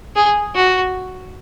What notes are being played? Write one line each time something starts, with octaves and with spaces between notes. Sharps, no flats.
G#4
F#4